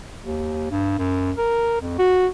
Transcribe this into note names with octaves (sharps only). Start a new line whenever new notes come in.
D#2
G2
F#2
A#4
F2
F#4